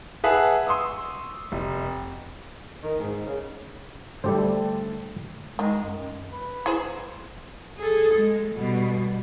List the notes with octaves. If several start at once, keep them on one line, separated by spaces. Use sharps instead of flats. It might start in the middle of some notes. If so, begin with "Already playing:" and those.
G#4 B4 E5 F#5 A5
C6 C#6 D#6 E6
F1
D#3
G#2
C#3
D3 G3 A3 G4 A4 C5
D#3 G#3
F#2
B4
E4 G#4 C5
G#4 A4
G#3
B2 G3